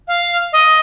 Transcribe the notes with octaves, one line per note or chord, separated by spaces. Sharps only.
F5
D#5